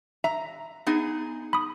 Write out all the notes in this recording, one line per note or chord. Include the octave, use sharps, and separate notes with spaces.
E5 A#5
B3 D#4 G#4
B5 D#6